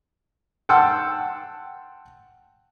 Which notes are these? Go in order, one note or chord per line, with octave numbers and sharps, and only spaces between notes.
F#5 G5 A5 C6 E6